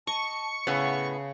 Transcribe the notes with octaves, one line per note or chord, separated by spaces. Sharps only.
D#5 A5 C#6
A2 C#3 B3 F#5